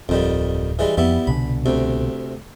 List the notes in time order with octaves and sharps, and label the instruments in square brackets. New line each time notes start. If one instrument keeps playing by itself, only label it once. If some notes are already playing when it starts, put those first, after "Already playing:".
[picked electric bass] D1 [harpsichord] F2 D#3 G3
[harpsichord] E3 G3 G#3
[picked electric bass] F2 [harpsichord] G3 B3 E4
[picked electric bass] C2 B2 D3 [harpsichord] B5
[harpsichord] D2 C3